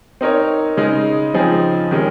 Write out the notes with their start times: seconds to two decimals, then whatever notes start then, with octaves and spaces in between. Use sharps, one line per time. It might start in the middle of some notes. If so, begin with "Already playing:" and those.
0.21 C4 D#4 A#4 C#5
0.77 C#3 G#3 D#4
1.34 C#3 F3 C4 D#4 G#4
1.91 C3 D#3 G#3 C#4